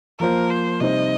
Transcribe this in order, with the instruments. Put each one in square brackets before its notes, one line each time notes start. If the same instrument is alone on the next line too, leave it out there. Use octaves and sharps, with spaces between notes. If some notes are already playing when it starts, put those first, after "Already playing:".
[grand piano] F3 A#3 F4 C5 [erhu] A#4
[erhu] C5
[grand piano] C3 G3 D#4 C5 [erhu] D#5